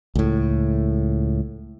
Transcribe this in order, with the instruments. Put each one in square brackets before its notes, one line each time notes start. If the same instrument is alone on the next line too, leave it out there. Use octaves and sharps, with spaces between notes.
[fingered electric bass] C#2 A2